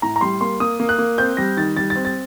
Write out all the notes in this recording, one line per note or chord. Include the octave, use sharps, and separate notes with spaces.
A2 A#5
A#5
G3 C6
A#3 C6
A#3 D#6
A#3
F#6
A#3
C4 G6
G3 A#6
D#3 A6
G3 A6
A6
C4
A6